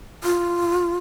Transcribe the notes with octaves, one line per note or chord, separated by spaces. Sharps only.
F4